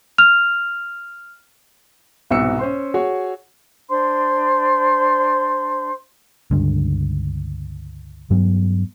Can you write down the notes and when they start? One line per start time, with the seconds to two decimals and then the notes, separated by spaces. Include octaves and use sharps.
0.18 F6 F7
2.31 C2 G#2 B2 E6 C#7
2.59 C#4 C5 C6
2.94 F#4 G#4 C#5
3.90 D4 C5 C6
6.51 C#2 G2 D3
8.30 G2 F#3 B3